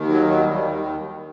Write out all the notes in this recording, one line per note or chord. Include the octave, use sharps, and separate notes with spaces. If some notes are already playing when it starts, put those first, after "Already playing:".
Already playing: D#2 D#3
F#3
F#3
D#2 D#3 G3